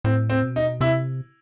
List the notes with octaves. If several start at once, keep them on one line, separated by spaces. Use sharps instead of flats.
A2 C4
C4
B2
D#4
C3 E4